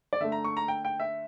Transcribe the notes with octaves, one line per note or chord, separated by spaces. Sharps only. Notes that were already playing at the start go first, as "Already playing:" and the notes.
D5
D3 A3 E5
A#5
C#6
A#5
G5
G5
E5